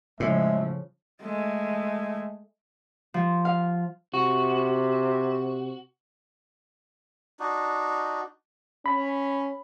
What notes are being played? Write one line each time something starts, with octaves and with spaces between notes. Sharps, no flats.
A2 C#3 F3 G#3 E5
G#3 A3
F3
F5
C3 F#4
D4 D#4 F#4
C#4 B5